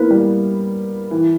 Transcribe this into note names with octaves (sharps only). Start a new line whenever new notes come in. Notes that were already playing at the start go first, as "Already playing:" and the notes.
Already playing: A#3 B3 E4 B4
G3
E3